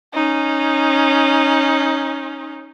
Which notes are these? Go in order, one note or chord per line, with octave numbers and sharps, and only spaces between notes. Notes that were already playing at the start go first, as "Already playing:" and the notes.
C#4 D#4